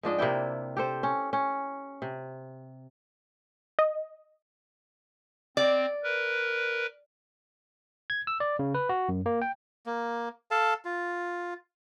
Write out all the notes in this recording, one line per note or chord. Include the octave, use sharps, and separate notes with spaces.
G#2 F3 D4 D#5
C3 A#3 E4 G5
G4 A4 C5
C#4
C#4
C3
D#5
C4 D5
A#4 B4
G#6
E6
D5
C#3
B4
F#4
F#2
A#3
G5
A#3
A4 F5 A5
F4